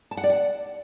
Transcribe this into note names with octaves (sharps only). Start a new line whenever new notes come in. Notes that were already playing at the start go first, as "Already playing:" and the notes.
A5
F#5
D5
F#5